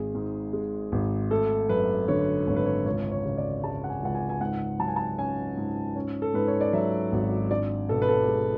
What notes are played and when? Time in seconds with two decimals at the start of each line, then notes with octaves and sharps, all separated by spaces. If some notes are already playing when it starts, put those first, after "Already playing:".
Already playing: G#1 G#4
0.15 G#2
0.53 G#3
0.92 G#1
1.31 A3 A4
1.69 F#2 B4
2.08 D3 C#5
2.47 G#1 C#5
2.56 B4
2.66 C#5
2.86 C#2 C#5
3.11 C#5
3.25 C#3
3.37 D5
3.63 G#3 A5
3.84 F#5
3.89 G#5
4.02 C#2 F#5
4.15 G#5
4.29 G#5
4.41 G#2 F#5
4.79 F#3 A5
4.88 G#5
4.96 A5
5.18 C#4 G#5
5.57 G#2
5.96 C#4
6.22 A4
6.34 G#2 B4
6.48 C#5
6.61 D5
6.73 F#3 E5
7.12 G#1
7.51 D4 D5
7.89 B2 A4
8.02 B4
8.08 A4
8.28 G#3